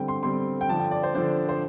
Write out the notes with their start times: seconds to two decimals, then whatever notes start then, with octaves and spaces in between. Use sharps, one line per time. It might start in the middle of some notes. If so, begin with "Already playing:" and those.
Already playing: D3 G3 C4 G5
0.08 C6
0.23 D3 G3 C4 C6
0.61 G5
0.69 D3 F3 D4 A5
0.80 G5
0.91 D5
1.03 C5
1.14 D3 F3 D4 C5
1.49 C5